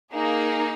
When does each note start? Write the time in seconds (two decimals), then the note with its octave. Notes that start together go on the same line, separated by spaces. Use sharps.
0.12 A#3 D#4 G#4